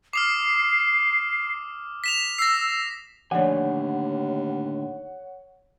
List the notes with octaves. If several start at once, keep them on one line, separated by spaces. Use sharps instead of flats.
D6 D#6 F6 C7
B6 E7 F7
E6 A#6 C7
D#2 A2 D3 F3 C#5 D5 F#5 G#5